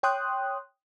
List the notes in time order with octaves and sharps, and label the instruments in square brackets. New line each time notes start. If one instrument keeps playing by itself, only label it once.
[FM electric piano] C#5 G5 C6 D#6 F#6